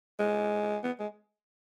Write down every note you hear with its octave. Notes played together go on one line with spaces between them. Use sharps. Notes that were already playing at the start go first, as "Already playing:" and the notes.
G#3
B3
G#3